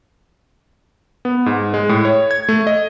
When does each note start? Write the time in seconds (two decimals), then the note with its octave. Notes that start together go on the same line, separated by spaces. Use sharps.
1.25 B3
1.46 G#2
1.74 G#3
1.89 A2
2.05 C#5
2.31 G#6
2.49 A3
2.67 D#5